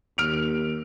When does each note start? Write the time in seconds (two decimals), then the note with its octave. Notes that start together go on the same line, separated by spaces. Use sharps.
0.18 D#2 F6 D7 F7